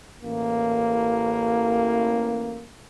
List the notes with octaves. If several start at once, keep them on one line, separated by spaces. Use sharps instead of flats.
A1 A#3